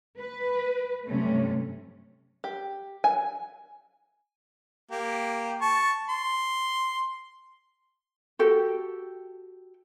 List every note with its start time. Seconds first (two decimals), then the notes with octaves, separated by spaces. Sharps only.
0.20 B4
1.07 G2 C3 F#3 A3 C#4
2.44 G4
3.04 G#5
4.91 A#3 G4
5.61 A5 C#6
6.09 C6
8.39 F#4 G4 A4 G5